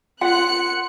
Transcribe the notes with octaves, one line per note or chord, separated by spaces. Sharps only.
F4 F#5 C6 F#6 C#7